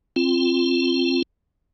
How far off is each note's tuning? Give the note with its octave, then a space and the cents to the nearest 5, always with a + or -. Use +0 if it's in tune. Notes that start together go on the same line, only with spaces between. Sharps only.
C4 +20 F4 -10